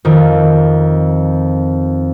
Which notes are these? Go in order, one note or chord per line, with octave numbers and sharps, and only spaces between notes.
F2 D#3